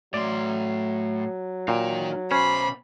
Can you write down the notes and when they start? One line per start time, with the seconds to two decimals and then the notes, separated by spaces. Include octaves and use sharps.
0.14 A2 F#3 D5 C6
1.68 A#2 D#4 G5
2.31 B2 C#4 C5 B5